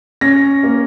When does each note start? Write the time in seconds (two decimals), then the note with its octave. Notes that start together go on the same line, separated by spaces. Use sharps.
0.21 C#4 A#6
0.63 A#3